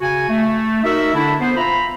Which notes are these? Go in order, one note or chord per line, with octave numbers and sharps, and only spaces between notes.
C#3 F#4 G#5
A3
D#4 F#4 A#4 E5
D3 D4 E4
B3 C5
F4 E5 A#5 B5